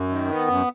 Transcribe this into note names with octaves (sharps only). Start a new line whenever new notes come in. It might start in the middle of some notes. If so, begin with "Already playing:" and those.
Already playing: F#2
D#3
B3
F#2